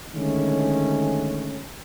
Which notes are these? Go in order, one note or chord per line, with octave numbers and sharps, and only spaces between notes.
D3 D#3 G#3 A3 C#4